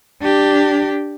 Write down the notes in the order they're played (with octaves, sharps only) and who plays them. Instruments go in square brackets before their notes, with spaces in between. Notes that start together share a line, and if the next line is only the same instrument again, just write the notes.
[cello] D4 G4